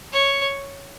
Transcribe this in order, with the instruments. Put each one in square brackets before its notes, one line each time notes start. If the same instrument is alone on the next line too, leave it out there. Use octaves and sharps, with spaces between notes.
[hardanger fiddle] C#5